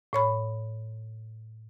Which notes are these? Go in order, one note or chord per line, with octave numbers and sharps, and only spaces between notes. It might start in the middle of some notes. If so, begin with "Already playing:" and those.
A2 C#5 B5